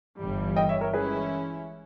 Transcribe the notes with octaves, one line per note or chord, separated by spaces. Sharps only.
G1 G2 E3 G3
D#5 G5
C#5 E5
A#4 C#5
E3 G#3 C#4 E4 G#4 B4